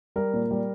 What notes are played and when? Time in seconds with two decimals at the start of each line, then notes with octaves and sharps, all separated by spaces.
0.16 G3 A#4
0.33 A#2
0.51 G3